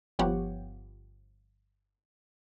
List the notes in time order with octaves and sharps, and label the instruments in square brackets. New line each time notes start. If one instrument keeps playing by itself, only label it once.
[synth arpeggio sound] G1 F3 B3 G4 C#5 F#5